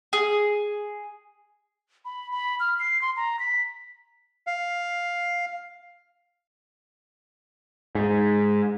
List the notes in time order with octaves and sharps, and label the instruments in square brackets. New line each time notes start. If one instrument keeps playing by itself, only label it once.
[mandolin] G#4
[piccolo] B5
B5
F6
C7
C6
A#5
B6
[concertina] F5
[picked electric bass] G#2